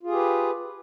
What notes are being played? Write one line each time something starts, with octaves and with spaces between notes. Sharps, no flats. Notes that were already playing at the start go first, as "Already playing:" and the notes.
F4 G4 G#4 B4